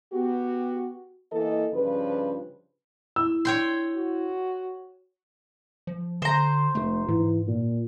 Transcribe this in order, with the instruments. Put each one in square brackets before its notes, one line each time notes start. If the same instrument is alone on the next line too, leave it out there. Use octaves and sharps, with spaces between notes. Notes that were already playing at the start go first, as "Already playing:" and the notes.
[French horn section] B3 F#4 G4
E3 A#3 A4 D#5
G2 C#3 F3 B4
[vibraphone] E4 [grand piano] E6
[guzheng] C#5 G5 C6
[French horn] F#4
[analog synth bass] F3
[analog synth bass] D3 [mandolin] C5 A#5
[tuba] F1 [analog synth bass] A3
[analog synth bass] G#2 [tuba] E3
[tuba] A#2